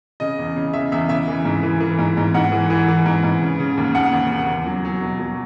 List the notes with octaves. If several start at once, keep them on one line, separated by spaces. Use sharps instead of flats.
C#3 D#5
E2
C#3
C#3 E5
E2 E5
C#3 E5
E3
G#2
E3
E3
G#2
G#2
G#2 F#5
E3
E3
E3
G#2
G#2
C#3
C#3
D#2
D#2 F#5
D#2
C#3
E2
F#3
F#3
B2
F#3